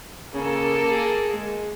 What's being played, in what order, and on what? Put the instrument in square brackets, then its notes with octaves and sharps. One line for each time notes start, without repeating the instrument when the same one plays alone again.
[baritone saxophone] C#3 [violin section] A#3 A4
[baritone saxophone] G#4
G#3